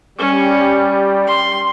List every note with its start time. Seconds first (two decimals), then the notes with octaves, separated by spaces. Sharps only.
0.18 G3 C#4
1.27 C6